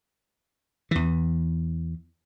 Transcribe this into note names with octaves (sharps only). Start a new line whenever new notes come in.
E2 E3